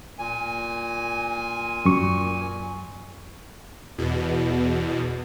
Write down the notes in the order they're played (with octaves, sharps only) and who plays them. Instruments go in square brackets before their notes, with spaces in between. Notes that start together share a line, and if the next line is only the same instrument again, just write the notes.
[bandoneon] A#2 G#5
[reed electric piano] F#2 C#6
[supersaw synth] E2 B2